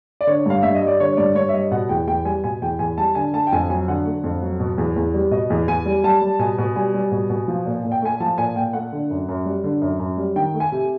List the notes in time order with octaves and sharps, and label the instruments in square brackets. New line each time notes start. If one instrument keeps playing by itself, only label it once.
[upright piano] D5
D3 C#5
G2 F5
G2 E5
D#5
G3
D5
D3 C#5
G2 D5
G2 C#5
E5
G3 D#5
B2 F#5
E2 G5
E2 G5
G3 G#5
B2 G#5
E2 G5
E2 G#5
G3 A5
D3 G#5
A3 A5
G5
F2 G#5
F#3 G#5
D3 F#5
A3
F2
F#3
B2
E2
E2
G3
B2 D#5
E2
E2 G#5
G3
G3 A5
G3
B2 G#5
B2
G3 G#5
G3
B2
B2
F3
A#2
A#2
G5
A3 G#5
F3 A5
A#2 G#5
A#2 G5
A3 F#5
D3
F#2
F#2
G3
D3
F#2
F#2
G3
D#3 G5
A3
G#5
C3